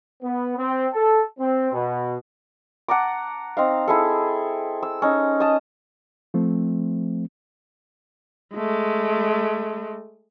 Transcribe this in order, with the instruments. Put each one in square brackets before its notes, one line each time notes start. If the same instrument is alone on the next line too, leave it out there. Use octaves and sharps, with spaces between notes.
[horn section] B3
C4
A4
C4
B2
[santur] F#5 A5 A#5 D6
C4 D#4 F5
E4 G#4 A4
E6
C#4 D#4
D#5 A5
[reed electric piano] F3 A3 C4
[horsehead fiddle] G#3 A3